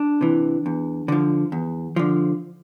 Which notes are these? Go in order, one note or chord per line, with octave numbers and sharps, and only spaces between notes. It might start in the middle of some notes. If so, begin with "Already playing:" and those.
Already playing: D4
C3 E3
E2
D3 F3
E2
D3 F3